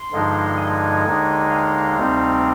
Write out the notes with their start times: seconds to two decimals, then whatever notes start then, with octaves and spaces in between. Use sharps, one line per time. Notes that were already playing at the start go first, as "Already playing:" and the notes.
Already playing: C6
0.12 G2 D3 F3 G#3 D#4
0.58 G#5
1.04 D#2 D3 G#3 D#4
1.50 F5
1.96 D2 C3 G3 C4 D#4